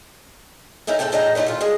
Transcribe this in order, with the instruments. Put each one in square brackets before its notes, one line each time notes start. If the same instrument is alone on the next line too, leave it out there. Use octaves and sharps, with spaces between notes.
[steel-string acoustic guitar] D2 C#4 D#4 E4 E5
E2 A2 F#3 A3 A4 G5
E2 A2 D4 D#5 G5 A#5
A#2 F#3 D#4 E4 G4
D#2 F4
G2 G#3 G#4 D#5